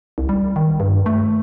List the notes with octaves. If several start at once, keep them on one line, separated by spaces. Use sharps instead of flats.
C2
G3
D#3
G2
A3